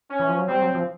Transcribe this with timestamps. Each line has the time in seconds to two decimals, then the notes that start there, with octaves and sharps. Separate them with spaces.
0.11 C#4
0.20 E3
0.29 F3
0.39 F#3
0.48 G3 C4
0.62 F#3
0.75 F3